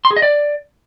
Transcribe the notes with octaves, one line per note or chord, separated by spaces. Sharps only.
C6
G#4
D#5
D5